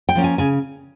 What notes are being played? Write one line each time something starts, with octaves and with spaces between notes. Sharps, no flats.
G5
F3 A#3 C#4
G#5
C#3 G#5